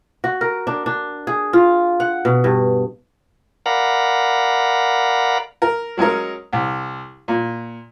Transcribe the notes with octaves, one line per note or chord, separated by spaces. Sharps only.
F#4
A#4
D4
D4
G#4
F4
F#5
B2
G2
A#4 D5 F5 F#5 A#5 B5
A#4
F#3 G#3 C#4 A#4
C2
A#2